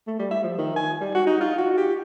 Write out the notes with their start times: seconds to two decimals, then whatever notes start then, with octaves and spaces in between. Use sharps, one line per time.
0.07 A3
0.19 G3
0.31 E5
0.43 F3
0.58 D#3
0.76 G#5
1.01 G3
1.15 F#4
1.27 D#4
1.41 F4
1.58 F#4
1.78 G4